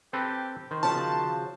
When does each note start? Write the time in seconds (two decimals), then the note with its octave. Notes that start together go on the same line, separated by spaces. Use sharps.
0.13 C4 G4 A4 B4
0.71 D#3 C5
0.83 C#3 F3 F#4 A5